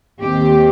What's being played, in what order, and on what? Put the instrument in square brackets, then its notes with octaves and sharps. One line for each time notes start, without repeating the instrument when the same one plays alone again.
[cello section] D#2 D#3 C4 G4